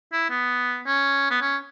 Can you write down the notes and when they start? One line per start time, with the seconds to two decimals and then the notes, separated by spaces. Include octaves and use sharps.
0.13 E4
0.30 B3
0.87 C#4
1.30 B3
1.41 C#4